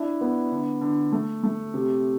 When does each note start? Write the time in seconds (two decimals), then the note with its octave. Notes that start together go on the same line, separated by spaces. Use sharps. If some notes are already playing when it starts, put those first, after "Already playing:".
Already playing: D4 E4
0.21 B3
0.51 D3
0.81 D3
1.12 A3
1.43 A3
1.74 C3